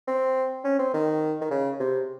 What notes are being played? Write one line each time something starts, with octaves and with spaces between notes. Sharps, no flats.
C4
C#4
C4
D#3
D#3
C#3
C3